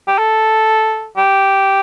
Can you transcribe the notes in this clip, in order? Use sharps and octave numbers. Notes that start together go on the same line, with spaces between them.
G4
A4
G4